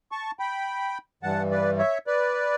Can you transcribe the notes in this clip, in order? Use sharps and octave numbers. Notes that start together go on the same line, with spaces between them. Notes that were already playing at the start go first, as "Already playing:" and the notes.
A5 C#6
G5 B5
G2 E3 G3 F#5 A5
B4 D5
C#5 E5
B4 D5